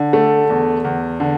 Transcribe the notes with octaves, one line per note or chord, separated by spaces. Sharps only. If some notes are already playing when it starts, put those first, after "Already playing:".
Already playing: D3
A3
E2
E2
D3